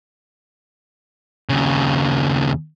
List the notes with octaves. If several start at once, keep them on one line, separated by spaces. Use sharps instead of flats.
D#2 C#3